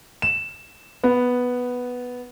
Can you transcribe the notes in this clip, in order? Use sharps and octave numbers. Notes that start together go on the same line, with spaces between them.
E7
B3